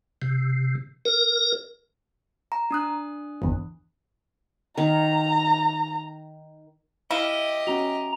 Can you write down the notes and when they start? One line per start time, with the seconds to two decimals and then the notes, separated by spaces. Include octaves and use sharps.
0.22 C3
1.05 A#4
2.52 A#5
2.71 D4 D#6 F#6
3.42 G1 E2
4.78 D#3 A#5
7.11 E4 G4 D#5 F5
7.67 C#4 F#4 A#5